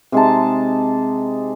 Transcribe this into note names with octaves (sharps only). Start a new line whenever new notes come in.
C3 G#3 D#4 A5